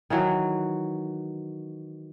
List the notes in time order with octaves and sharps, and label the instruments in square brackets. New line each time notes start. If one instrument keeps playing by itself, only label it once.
[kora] D#3 E3 F#3